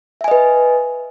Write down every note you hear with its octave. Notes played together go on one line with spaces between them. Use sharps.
B4 D#5 E5 G#5